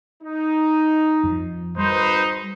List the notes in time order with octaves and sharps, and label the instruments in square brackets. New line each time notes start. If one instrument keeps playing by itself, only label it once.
[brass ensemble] D#4
[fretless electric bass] F2 F3
[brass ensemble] G#1 B4 C5 [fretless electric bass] G3 [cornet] D#4